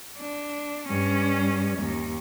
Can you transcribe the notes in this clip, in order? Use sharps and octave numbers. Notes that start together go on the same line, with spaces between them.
D4
G2 C#4
D#2